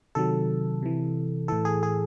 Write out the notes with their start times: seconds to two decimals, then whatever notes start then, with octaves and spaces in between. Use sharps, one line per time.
0.15 C3 D#3 F#3 A4
0.83 C3 E3
1.48 A2 E3 A4
1.65 G#4
1.83 G#4